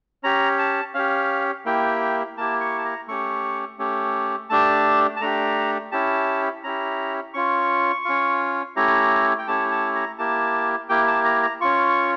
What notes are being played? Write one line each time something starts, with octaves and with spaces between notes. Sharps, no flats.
C#4 G4 A#5
A5
C#4 G4 F5
A#3 E4 G4 G5
A#3 E4 G4 A5
C#6
A5
A#5
A3 C#4 G4 C#6
A3 C#4 G4
A3 D4 G4 A5
A5
A3 D4 G4 A#5
C#4 E4 G4 A5
C#4 E4 G4 A#5
C#4 F4 C#6
C#4 F4
A3 C#4 E4 G4 A#5
G5
A3 C#4 E4 G4 A5
A5
A#5
A#3 E4 G4 A5
A#3 E4 G4 G5
A5
A#5
A#5
C#4 F4 C#6